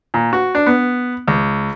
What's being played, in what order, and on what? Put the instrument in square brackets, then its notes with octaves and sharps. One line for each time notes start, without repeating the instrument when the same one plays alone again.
[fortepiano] A#2
F#4
D4
B3
C#2